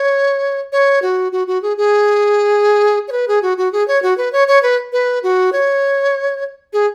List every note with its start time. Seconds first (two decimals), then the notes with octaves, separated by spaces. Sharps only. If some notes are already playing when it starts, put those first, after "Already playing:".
Already playing: C#5
0.72 C#5
1.02 F#4
1.32 F#4
1.47 F#4
1.62 G#4
1.77 G#4
3.08 C#5
3.12 B4
3.28 G#4
3.43 F#4
3.58 F#4
3.72 G#4
3.88 C#5
4.02 F#4
4.18 B4
4.33 C#5
4.48 C#5
4.63 B4
4.92 B4
5.23 F#4
5.53 C#5
6.73 G#4